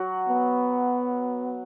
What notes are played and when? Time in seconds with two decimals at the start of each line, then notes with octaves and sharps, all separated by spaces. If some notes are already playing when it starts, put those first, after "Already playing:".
Already playing: F#3 F#4
0.29 B3